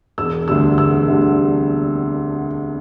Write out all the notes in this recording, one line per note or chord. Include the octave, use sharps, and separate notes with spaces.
E1 E6
D2 D3 G3 E6
E1 E6
D2 D3 G3